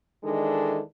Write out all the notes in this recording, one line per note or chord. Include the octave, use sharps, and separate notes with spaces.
D#3 E3 G#3 D4 A4